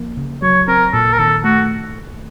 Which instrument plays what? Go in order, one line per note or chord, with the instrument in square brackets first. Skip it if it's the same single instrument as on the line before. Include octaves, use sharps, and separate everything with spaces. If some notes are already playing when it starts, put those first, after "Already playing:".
Already playing: [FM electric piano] F3 A#3
C#3
[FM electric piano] F#3 [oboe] C#5
[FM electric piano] C4 [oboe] A#4
[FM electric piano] A#2 [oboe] A4
[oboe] A#4
[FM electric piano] D#3 [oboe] A4
[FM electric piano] A3 [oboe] F#4